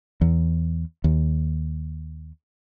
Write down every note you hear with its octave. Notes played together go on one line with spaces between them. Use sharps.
E2
D#2